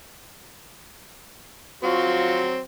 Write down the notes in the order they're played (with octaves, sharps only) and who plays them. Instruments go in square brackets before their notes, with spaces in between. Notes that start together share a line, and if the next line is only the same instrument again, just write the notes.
[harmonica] F#3 C4 F#4 [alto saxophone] F4